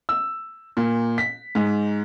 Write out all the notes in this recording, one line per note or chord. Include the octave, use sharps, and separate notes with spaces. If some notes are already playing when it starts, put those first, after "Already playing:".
E6
A#2
B6
G#2